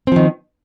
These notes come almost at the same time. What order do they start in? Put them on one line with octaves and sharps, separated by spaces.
C4 F3 D#3